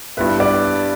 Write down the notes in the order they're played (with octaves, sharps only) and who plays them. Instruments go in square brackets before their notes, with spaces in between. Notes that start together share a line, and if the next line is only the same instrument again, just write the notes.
[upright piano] G2 G3 B3 E4 [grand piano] B4
[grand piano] D5